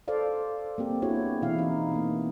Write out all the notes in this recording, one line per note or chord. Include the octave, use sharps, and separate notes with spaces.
A4 C5 D5 F5
A#3 C4 G4
B3 D4 E4 F#4 G#4 C#5
B2 E3 E4 F5
C4 D#4
A#3 B3